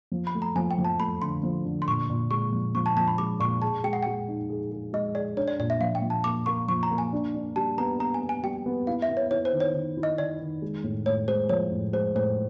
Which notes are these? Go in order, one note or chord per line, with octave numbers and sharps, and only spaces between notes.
F3
B5
A3
A#5
F3 G#5
G5
F3
A5
A3 B5
D3 C6
F3
D3
C6
A#2 C#6
A#2
G#3 C#6
F3
F3 C#6
A5
F3 A5
B5
G#3 D6
A#2 C#6
G#4 A5
G#3 G5
F#5
G#3 G5
D#4
G#4
G#4
G#3 D#5
G#4 D5
D4 C#5
D5
A#2 D5
E5
F3 F5
G5
F3
A5
A#3 D6
A#3 C#6
F3 C#6
A#5
A#3
G#5
D4
D4
G3 A5
B3 A#5
B3 A#5
G#5
B3
G#5
G3 G5
B3
E4 F5
E5
B3
C#5
E4 C#5
C5
D#3
C#5
D#3
E4
D#5
D#3 D5
D#3
G#3
A2
A2 C#5
G#3 C5
F3 C#5
A2
G#3 C5
A2 C5